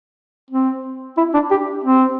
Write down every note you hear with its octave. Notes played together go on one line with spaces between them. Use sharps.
C4
E4
D4
G4
C4